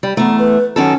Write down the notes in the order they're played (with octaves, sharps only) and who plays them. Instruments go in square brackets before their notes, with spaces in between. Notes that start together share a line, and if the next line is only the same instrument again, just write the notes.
[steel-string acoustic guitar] G3
[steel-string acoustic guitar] E2 A3 [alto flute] A#5
[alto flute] B4
[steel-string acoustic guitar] F#2 D#3 A4 [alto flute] C#4